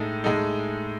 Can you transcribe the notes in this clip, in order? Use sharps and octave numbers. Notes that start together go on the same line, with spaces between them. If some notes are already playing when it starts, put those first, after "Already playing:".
Already playing: A2 G#3 D#4 A4
A2 G#3 D#4 A4